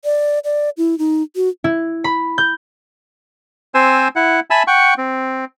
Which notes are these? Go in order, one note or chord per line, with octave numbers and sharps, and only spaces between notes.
D5
D5
E4
D#4
F#4
E4
B5
G6
C4 C5 G#5 E6
E4 F#5
E5 G#5 A5 B5 E6
F#5 G5 C#6
C4